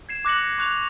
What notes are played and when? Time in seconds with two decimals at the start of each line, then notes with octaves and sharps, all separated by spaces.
0.09 G#6 C7 E7
0.25 D6 F#6 A#6 C#7 F#7
0.58 C#6 F#6 F7